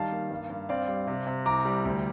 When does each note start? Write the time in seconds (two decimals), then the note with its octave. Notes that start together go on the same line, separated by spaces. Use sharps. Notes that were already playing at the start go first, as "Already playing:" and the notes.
Already playing: D#3 G3 F5 A5
0.12 A#3
0.31 G2
0.50 G2
0.69 C4 D5 F5
0.88 G3
1.07 C3
1.27 C3
1.46 C2 A#5 D6
1.65 G3
1.85 D2